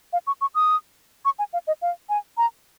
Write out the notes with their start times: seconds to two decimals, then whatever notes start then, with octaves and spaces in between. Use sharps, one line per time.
0.13 F5
0.27 C#6
0.41 C#6
0.55 D#6
1.25 C#6
1.39 G#5
1.53 F5
1.67 D#5
1.82 F5
2.09 G#5
2.37 A#5